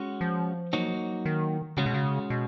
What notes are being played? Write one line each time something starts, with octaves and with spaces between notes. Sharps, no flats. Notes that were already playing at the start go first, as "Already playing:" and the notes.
Already playing: G#3 C#4 F#4 C#5
F3
F#3 A#3 D#4 F#4 C#5
D#3
C#3 G#3 C#4 F#4
B2
C#3
B2